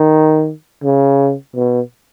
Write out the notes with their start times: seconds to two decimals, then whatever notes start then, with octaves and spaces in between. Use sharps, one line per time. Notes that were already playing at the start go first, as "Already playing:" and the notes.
Already playing: D#3
0.84 C#3
1.56 B2